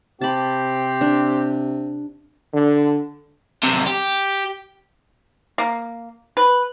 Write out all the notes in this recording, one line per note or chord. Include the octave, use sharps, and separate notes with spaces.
C3 C4 G4 A5 B5
D4
D3
B1 C3
G4
A#3
B4